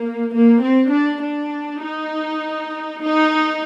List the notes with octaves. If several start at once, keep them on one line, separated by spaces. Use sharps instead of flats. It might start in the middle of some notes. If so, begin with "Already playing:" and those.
Already playing: A#3
A#3
C4
D4
D4
D#4
D#4